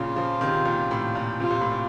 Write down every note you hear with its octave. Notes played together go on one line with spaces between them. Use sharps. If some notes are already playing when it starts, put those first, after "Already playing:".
Already playing: A#2 C#3 F4
C#3 F3
C3 D#3
A#2
A2
A#2
C3 F4
A#2
A2
A#2